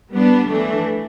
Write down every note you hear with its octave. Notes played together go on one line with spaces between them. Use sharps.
G3 B3 D4
E3 A3 D4